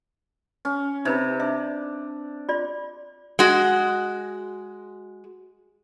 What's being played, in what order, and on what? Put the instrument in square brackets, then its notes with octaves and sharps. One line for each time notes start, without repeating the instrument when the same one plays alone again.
[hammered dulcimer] C#4
[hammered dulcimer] C3 [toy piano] D#4 B4 B5
[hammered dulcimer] D4 [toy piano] E5
[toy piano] F4 D5 C6
[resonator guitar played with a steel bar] G#3 F#4